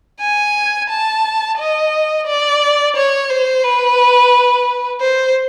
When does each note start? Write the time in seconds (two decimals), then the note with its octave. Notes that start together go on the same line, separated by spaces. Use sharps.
0.20 G#5
0.90 A5
1.59 D#5
2.27 D5
2.96 C#5
3.30 C5
3.63 B4
5.00 C5